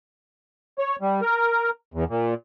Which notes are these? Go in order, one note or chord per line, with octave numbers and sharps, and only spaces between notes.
C#5
G3
A#4
E2
A#2